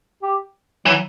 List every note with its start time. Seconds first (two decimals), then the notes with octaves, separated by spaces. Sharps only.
0.23 G4
0.86 E3 F#3